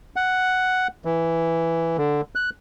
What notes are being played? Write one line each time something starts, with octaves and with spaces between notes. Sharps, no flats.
F#5
E3
D3
F#6